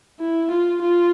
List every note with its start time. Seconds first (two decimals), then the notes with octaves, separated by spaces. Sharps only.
0.20 E4
0.51 F4
0.82 F4